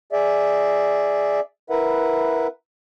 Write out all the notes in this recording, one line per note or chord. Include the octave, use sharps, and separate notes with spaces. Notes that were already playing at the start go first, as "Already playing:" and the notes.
G#4 D5 E5
E4 A#4 B4 E5 F#5